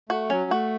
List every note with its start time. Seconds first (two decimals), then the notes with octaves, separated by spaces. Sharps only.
0.09 A3 F#4
0.30 F#3 C#4
0.51 A3 F#4